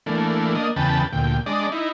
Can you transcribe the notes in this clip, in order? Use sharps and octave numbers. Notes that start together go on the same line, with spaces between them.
E3 A3 A#3 D4
A#3 D4 D#5
E2 C#3 B4 G5 A5
D2 A#2 G5
G#3 D4 D5 D#5
D#4 E4